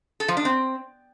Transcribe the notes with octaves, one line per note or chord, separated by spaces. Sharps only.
A4
F3
D4
C4